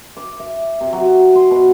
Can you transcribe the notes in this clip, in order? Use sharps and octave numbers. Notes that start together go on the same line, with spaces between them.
D6
E5
C3
F#3
C6
B2